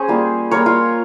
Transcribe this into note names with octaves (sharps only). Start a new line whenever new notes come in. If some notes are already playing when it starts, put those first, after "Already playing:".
Already playing: C#4 G#4 C5
G3 A#3 F4
G3 A#3 F4 A#4 C#5
F4